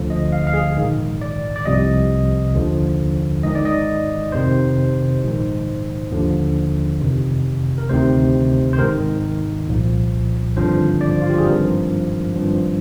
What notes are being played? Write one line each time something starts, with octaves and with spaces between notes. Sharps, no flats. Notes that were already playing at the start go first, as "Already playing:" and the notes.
Already playing: D2 D3 F3
D#5
F5
F5
G#4
A#1 G#2 D#3
D5
D5
C2 C3 F3 D#5
D#2 D3 F3
G#1 G#2 D#3 D#5
D5
D#5
F2 C3 D#3 C5
A#1 G#2 D#3
D#2 D3 F3
F2 C3 D#3
A#4
D2 C3 D#3 C5
C5
G#1 G#2 D#3 A#4
C2 A#2 F3
G#1 G2 D3 F3 C5
D5
F4
G4
G#4
G#1 G2 F3 A#4
G#1 G2 F3